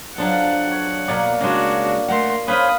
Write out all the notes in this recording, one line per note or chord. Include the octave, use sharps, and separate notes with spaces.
F3 F#3 D4 A4 F#5
C#5
B2 F#3 A#3 C#5 D5
C#3 G#3 D4 F#4
A3 A#4 F#5 C6
C#4 B4 C5 F5 B5 D#6